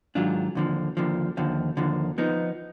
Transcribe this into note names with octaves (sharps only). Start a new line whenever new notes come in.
G#2 D#3 F#3 D4 F4
D#2 D3 F3
D#2 D3 F3
D#2 D3 F3
D#2 D3 F3
F3 B3 D#4